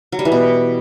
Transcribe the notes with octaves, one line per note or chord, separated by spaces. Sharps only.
F#3
G3
E3
B2